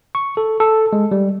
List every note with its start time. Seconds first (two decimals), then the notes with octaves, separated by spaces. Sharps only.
0.15 C#6
0.37 A4
0.60 A4
0.93 G#3
1.11 G3